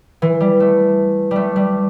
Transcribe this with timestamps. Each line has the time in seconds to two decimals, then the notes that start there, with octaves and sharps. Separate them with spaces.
0.22 E3
0.40 G3
0.60 A3
1.31 G3 A3
1.56 G3